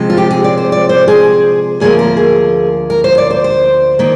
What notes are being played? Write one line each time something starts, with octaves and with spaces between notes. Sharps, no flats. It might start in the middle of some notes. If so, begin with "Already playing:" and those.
Already playing: C3 F3 G#3
F4
G4
G#4
D5
C5
D5
C5
G#4
D2 D3 F3 A#3 G#4
A#4
G#4
A#4
C5
D5
C5
C5
D#3 A#3